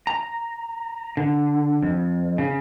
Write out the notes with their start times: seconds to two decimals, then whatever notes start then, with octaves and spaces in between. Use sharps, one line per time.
0.07 A#5
1.17 D3
1.82 F2
2.38 C#3